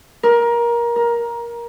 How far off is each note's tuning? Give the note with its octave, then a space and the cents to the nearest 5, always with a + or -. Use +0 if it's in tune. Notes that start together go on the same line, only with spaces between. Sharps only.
A#4 +20
A#4 +15